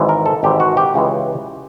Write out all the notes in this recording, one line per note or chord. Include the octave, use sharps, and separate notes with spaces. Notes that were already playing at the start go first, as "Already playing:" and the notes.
Already playing: G#1 G#2 E3
A#4
A4
G#1 G#2 E3 G4
F#4
G4
C#2 C#3 E3 G#3